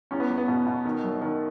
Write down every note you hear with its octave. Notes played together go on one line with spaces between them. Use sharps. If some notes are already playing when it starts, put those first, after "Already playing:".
E2 C#4
B3
E2
B3
B2
B2
D#3
F#2
D#3